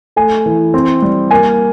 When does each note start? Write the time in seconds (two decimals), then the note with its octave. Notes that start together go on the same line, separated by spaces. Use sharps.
0.16 A3 G#5
0.46 E3
0.74 C4
1.02 G3
1.31 A#3 G#5